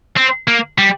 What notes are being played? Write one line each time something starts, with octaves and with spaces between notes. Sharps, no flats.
C4
A#3
G3